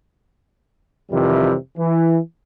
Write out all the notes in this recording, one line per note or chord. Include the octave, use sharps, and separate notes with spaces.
F2 C3 D#3 E3 G3
E3